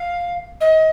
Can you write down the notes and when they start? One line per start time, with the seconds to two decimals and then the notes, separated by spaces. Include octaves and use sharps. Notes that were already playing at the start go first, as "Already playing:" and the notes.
Already playing: F5
0.60 D#5